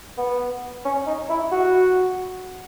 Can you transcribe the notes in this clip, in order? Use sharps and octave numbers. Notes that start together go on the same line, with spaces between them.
B3
C#4
D#4
E4
F#4